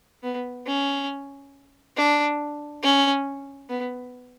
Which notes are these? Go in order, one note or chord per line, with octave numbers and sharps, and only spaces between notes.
B3
C#4
D4
C#4
B3